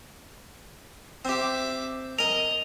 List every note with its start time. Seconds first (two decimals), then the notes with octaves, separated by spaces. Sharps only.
1.25 C4 G4 E5 D6
2.19 A#4 D#5 G#5 F7